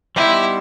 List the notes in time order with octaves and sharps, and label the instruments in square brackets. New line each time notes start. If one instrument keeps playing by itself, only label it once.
[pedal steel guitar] G3 B3 D#4 G4 C5 [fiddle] E4